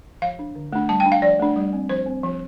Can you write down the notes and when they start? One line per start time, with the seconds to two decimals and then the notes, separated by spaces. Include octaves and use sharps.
0.22 F3 F5
0.39 D4
0.55 D3
0.73 A3 D4
0.89 G3 A5
1.00 G5
1.06 D4
1.12 F5
1.22 F3 D5
1.39 A3 D4
1.56 G3
1.73 C4
1.89 F3 C5
2.06 C4
2.23 F3